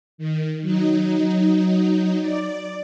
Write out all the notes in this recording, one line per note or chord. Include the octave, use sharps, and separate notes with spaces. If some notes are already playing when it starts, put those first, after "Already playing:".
D#3
F#3 D#4
D5